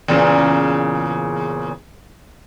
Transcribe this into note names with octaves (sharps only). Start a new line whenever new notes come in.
E2 A#2 C#3